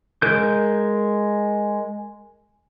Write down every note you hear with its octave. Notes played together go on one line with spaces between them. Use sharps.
G#3 A#4 G6